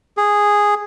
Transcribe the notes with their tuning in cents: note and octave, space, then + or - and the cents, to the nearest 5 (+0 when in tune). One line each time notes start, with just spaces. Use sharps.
G#4 -5